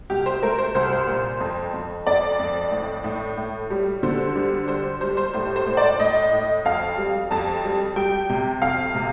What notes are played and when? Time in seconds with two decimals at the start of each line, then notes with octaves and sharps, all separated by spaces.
0.10 C2 G4
0.26 C5
0.43 A3 A#4
0.58 C5
0.75 C2 C5
1.07 A#2
1.41 F2
1.73 F2
2.07 F2 D5
2.39 F2
2.71 A2
3.04 A2
3.37 A2
3.70 G3
4.03 D3 C5
4.36 G3
4.68 G3 C5
5.01 G3 C5
5.17 C5
5.34 A2 C5
5.56 C5
5.67 A2
5.77 D5
6.00 A2 D#5
6.33 A2
6.65 F2 F5
6.98 G3
7.31 F2 A5
7.64 G3
7.96 G3 G5
8.29 C3
8.62 F2 F5
8.95 C3